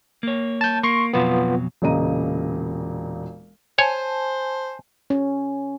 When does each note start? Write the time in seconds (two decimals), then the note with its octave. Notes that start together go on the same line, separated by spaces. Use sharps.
0.23 A#3 C#5
0.61 A5 G6
0.83 A#3 C6 C#6
1.13 F2 B2 F#3 B3 F4
1.82 E1 A#2 C#3 D#5 A#5 D#7
3.79 C5 C#5 G#5 A5
5.10 C#4